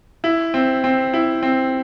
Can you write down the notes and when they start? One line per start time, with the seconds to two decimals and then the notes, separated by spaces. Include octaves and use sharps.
0.24 E4
0.54 C4
0.84 C4
1.14 E4
1.43 C4